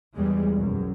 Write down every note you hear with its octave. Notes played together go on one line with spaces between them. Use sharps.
E2 G3 G#3
B1 F#2